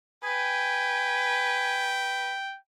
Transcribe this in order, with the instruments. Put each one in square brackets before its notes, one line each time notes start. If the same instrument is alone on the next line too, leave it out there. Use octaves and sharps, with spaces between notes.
[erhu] B4 [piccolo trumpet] G5 [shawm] G#5